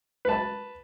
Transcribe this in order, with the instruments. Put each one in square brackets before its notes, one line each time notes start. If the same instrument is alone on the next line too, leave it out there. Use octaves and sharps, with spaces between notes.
[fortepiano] B4 A5